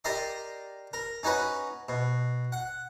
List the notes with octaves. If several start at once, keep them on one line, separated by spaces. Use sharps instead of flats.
G4 A#4 D5 D#5 C6
A#4
C#4 D#4 F#4 B4
B2
F#5